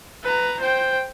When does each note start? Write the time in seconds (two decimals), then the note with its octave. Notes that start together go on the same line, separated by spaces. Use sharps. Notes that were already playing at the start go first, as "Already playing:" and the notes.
0.23 B4 A#5
0.60 C5 G5